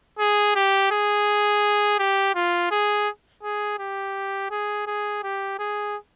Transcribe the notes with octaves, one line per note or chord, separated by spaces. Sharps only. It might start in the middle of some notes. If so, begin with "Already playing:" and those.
G#4
G4
G#4
G4
F4
G#4
G#4
G4
G#4
G#4
G4
G#4